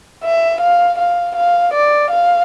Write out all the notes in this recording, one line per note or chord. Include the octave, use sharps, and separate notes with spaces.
E5
F5
F5
F5
D5
F5